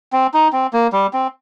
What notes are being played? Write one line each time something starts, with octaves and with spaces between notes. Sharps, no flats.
C4
D#4
C4
A#3
G3
C4